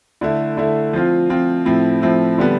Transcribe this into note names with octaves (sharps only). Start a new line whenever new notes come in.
D3 A3 E4
D3 A3 E4
F3 C4 F4
F3 C4 F4
A2 F3 C4 E4
A2 F3 C4 E4
D3 G3 B3